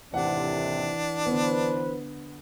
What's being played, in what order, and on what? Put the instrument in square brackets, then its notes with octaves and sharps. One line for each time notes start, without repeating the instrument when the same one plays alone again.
[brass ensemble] D#2 A2 C3 [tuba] E3 [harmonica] D4 [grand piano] F#5
[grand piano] D3 B3 [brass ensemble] B4 C5